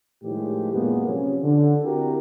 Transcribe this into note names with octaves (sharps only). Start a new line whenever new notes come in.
A2 D#3 F3 G#3 G4
F#2 A#2 G#3 A#3 B3
C3 F3 C#4
D3
C4 E4 F#4 G4 A#4